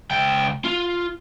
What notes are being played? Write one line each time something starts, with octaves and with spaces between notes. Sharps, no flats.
C#2 G5
F4